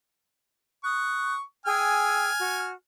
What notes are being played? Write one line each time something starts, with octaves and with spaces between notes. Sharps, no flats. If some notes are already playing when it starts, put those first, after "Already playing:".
C#6 D#6 F#6
G#4 G5 G#5 E6 F6
F#4